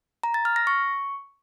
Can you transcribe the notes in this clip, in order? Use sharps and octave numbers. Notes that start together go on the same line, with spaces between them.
A#5
A6
F6
A#6
C#6